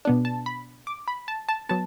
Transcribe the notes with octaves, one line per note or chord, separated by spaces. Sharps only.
B2 B3 D4
A5
B5
D6
B5
A5
A5
F#3 B3 A5